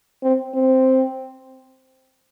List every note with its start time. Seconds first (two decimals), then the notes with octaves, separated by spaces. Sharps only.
0.23 C4
0.54 C4